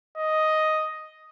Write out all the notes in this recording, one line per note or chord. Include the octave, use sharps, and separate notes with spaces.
D#5